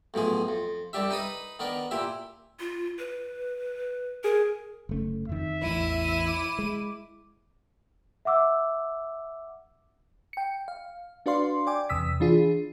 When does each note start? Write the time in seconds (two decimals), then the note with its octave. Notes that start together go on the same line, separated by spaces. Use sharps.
0.14 B1 A2 F3 G#4
0.48 F2
0.93 C2 G3 D4 G4 E5
1.10 D#4 B4 B5 D#6
1.59 D#3 B3 D4 A#4
1.91 A#2 E4 G4 E5
2.60 F4
2.99 B4
4.24 G#4 A#4
4.89 F#1 A3 C#4
5.29 F2 D#3 E5
5.62 A1 E2 E4 D#7
6.27 D6
6.59 G#3
8.25 E5 F#5 D6 E6
10.33 G5 C#7
10.68 F5
11.26 D4 F#4 B4 D5 F5 C6
11.67 D5 G5 G#5 D6
11.89 E2 C3 D#6 E6 B6
12.20 E3 D4 F4 G#4